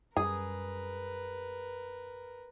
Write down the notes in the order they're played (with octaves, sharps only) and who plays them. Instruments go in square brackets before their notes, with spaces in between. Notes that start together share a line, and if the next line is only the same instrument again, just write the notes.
[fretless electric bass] F#2 G3 [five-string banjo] G#4 [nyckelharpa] A#4 B4